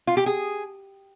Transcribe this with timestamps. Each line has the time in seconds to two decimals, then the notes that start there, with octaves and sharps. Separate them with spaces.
0.07 F4
0.17 G4
0.26 G#4